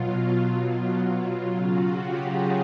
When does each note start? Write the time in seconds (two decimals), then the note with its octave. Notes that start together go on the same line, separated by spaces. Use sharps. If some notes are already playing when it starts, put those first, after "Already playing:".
Already playing: B2 F#3 F4
0.51 F4
1.39 C#3 F#3 F4
1.69 F#4
1.98 G4
2.27 G#4